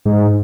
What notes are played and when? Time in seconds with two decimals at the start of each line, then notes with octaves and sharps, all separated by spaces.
0.05 G#2